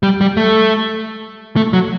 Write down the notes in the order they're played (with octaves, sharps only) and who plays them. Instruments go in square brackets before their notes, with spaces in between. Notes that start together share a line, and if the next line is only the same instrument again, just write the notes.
[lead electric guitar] G3
G3
A3
A3
F#3